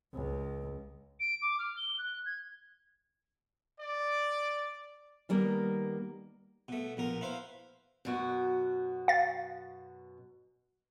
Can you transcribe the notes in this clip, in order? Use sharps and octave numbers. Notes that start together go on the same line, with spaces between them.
C#2
D7
D6
F6
G7
F#6
G#6
D5
D#3 G3 A#3 B3 A#4
B2 A3
A#1 B2 A#4
E4 B4 C5 F5
F#2 B2 F#4
F5 A6